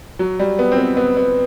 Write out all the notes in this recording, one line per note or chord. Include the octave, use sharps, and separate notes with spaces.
F#3
G3
B3
C4
B3
B3
B3